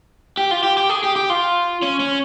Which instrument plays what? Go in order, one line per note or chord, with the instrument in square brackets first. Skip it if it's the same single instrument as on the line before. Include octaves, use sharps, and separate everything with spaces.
[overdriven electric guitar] G4
F4
G4
G4
G#4
G4
G4
F4
C#4
C#4